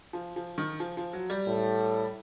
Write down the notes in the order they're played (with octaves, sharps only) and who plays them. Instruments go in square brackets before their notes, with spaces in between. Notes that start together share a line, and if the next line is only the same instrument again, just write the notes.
[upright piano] F3
F3
D#3
F3
F3
F#3
G3
[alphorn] A2